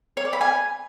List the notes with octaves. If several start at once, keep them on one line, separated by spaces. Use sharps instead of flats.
C#5
D5
B5
G#5